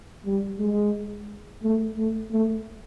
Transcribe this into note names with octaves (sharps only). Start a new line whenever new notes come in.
G3
G#3
A3
A3
A3